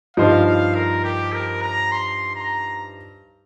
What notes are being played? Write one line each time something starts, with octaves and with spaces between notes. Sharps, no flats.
G2 F3 D#4 C5 F5
F5
A#4
G4
A#4
A#5
C6
A#5